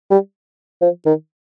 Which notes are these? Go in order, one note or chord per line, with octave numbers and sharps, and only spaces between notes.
G3
F3
D#3